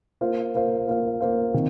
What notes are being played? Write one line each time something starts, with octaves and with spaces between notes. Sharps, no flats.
A#3 F4 C5 F5
A#3 F4 C5 F5
A#3 F4 C5 F5
A#3 F4 C5 F5
C3 D#3